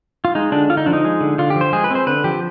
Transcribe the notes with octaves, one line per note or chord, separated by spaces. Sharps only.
F4
G#3 D#4
D3 D4
D3 F4
D#4
F3 D4
D#4
G#3
D3
D3 F4
G4
F3
C5
G#3 G#4
B4
C4 C5
D3 B4
F3 G4